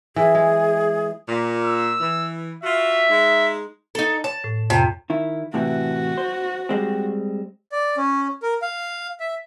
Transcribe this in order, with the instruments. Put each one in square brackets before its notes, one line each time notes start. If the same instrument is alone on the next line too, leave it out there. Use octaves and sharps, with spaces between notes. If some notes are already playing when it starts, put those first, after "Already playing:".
[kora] E3 [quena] G#4
[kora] G#3
[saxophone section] A#2
[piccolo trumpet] E6
[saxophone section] E3
[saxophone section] F4 F#4 [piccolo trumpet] E5
[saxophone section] G#3 D#4
[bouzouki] D#4 A4
[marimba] C#5 [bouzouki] A5
[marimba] A2
[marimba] F2 [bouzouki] C3
[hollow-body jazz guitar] D#3 E4
[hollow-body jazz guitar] A2 C3 E3 [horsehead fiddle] F#4
[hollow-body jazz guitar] C5
G3 G#3 C4
[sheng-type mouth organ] D5
C#4
A#4
F5
E5